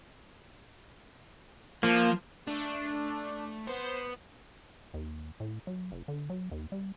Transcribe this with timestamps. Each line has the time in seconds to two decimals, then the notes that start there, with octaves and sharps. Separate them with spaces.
1.83 F3 A#3
2.47 A3 D4
3.67 B3 C5
4.94 D#2
5.40 A2
5.67 F#3
5.92 F1
6.08 D3
6.30 F#3
6.52 D#2
6.72 G3